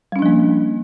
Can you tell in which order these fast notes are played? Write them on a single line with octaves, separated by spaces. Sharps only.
G3 C#4 D4 F3 A#3